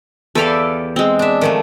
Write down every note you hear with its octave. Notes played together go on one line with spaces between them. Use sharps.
E2 G4 A4 D5 E5 F5
G#3 C4
D4 E5
D#3 F3 A3